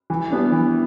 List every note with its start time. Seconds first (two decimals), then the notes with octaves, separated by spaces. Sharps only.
0.10 E3
0.30 G3 B3 D4
0.52 E3